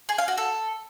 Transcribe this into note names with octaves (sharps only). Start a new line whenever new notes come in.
G#4
F5
F#4
A4